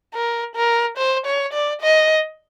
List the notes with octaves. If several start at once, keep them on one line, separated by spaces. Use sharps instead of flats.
A#4
A#4
C5
C#5
D5
D#5